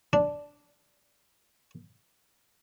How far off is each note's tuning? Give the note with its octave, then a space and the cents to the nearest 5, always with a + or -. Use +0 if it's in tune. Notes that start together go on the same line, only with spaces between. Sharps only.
D4 -5